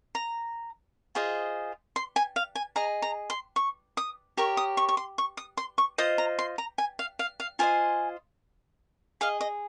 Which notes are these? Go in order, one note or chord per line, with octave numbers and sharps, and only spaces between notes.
A#5
F4 G#4 C5 D#5
C6
G#5
F5
G#5
G#4 D#5 A#5
A#5
C6
C#6
D#6
G4 A#4 C#5 C#6
D#6
C#6
C#6
C6
C#6
D#6
C6
C#6
F4 C5 D#5 D#6
A#5
C6
A#5
G#5
F5
F5
F5
F4 C5 D#5 G#5
G#4 D#5 F5
D#5